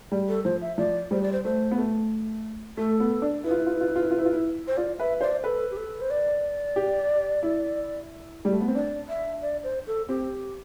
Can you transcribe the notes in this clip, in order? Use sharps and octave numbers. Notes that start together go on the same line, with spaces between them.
G3
A4
F3 C5
E5
F3 D5
G3 C5
D5
C5
A3 C5
B3
A3
A3 A4
B3
D4
E4 B4
F4
E4
F4
E4
F4
E4
F4
E4
F4
E4
F4
E4
C5
F4 D5
B4 E5
C5 D5
A4 B4
G4
A4
C5
D5
G4
E4
G3
A3
B3
C4
D4 D5
E5
D5
C5
A4
C4 G4